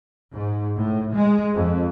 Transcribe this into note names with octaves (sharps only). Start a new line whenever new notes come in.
G#2
A2
G#3
F2